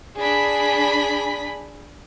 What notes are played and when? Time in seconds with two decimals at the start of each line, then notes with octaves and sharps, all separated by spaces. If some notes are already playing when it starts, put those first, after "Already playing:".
0.19 D4 G#4 B5 B6